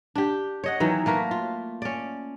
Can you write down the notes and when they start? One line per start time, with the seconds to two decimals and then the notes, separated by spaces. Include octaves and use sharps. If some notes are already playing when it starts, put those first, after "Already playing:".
0.15 D4 G4
0.64 C#5 D#5 F#5
0.80 D#3 E3 F#3 B3
1.06 A3 A#3 A#4 B4
1.31 F4
1.82 C#4 D5